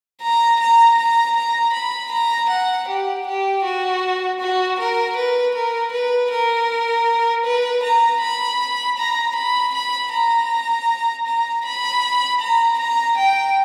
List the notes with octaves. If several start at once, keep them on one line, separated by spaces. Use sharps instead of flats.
A#5
A#5
A#5
A#5
B5
A#5
F#5
G4
G4
F#4
F#4
A#4
B4
A#4
B4
A#4
B4
A#5
B5
A#5
B5
B5
A#5
A#5
B5
A#5
A#5
G5